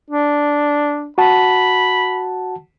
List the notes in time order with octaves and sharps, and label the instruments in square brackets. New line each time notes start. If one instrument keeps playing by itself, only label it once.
[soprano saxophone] D4
[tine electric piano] F#4 F#5 A5 [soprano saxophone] B5